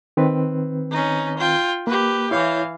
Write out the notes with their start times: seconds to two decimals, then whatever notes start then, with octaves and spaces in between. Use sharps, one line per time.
0.17 D#3 C4 B4
0.91 C#4 D#4
1.38 F4 G5
1.87 A#3 G4 B4
2.31 E3 E4 C#5 F5 G6